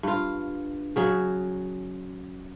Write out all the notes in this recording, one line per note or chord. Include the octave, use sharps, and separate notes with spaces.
G2 F4
C#3 F#3 G#4